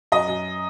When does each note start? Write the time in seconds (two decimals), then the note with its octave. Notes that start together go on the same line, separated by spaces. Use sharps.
0.12 F#2 D#5
0.28 F#2